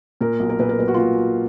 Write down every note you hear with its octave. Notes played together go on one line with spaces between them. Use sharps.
A#2 A#4
B1
A#4
A#2 B4
A#4
B1 B4
F#4
A#2 F4